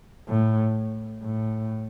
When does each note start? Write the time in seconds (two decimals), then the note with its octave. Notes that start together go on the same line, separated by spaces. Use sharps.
0.29 A2
1.23 A2